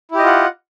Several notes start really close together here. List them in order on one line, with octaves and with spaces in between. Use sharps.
E4 G4 D#5 F4 F#5